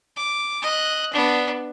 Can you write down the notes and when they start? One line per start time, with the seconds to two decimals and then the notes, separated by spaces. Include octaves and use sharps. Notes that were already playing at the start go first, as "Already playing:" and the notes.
0.16 D6
0.62 D#5 F#6
1.13 B3 D4